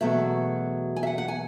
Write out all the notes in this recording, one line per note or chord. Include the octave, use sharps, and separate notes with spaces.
E2 B2 F#3 A3 E5
G#5
E5
F#5
F#5
G#5